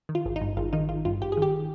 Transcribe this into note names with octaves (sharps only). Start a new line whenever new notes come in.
D#3
F4
G#1
D#4
G2
G#1 F4
D#3 D#4
G#1 F4
G2 F4
G#1 G4
G#4
D#3 G4